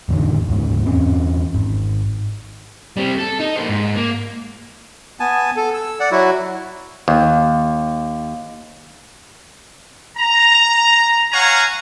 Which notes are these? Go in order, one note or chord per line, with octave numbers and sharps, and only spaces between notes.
A1 F2 D3 D#3
D2 G#2 C#3
E2 C4 C#4
G#1
G3 C4
A4
D#4
A#3 C5
G#2
A#3
B3 G#5 A5
A4
E6
D5 F#5
F#3 E4 F#4
D#2
A#5
C#5 F5 F#5 G#5 A#5